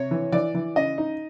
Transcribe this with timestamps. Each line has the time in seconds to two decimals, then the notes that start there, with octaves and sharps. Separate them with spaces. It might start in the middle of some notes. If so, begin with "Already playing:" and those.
Already playing: C3 C#5
0.11 E3
0.32 E3 D5
0.55 E3
0.76 C#3 D#5
0.98 D#4